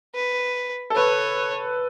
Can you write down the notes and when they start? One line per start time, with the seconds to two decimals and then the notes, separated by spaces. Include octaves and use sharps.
0.15 B4
0.90 A4
0.96 B4 C#5